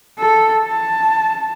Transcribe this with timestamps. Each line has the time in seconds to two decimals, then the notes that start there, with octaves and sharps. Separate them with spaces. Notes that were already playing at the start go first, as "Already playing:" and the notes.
0.19 A4
0.65 A5